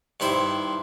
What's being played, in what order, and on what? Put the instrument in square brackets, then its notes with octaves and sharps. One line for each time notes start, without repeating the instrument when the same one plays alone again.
[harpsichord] G2 D#3 E4 C5